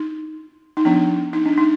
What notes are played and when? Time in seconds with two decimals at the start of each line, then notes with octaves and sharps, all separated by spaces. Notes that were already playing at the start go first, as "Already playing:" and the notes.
Already playing: D#4
0.77 D#4
0.85 F3 B3 D4
1.33 D#4
1.46 D4
1.58 D#4